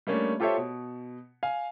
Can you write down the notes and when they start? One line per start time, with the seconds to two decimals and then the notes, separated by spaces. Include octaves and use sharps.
0.07 G3 A3 A#3 C#4 D4
0.40 F4 G4 A4 C5 C#5 E5
0.57 B2
1.43 F5 G#5